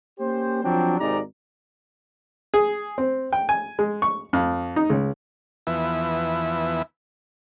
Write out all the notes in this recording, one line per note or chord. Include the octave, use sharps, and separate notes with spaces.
A#3 C#4 G4 C5
F3 F#3 C4 D4
G#1 G#2 C3 D#4 D5 A#5
G#4
C4
G5
G#5
G#3
C#6
F2
D#4
C#2
E2 E3 F3 B3 E4 E5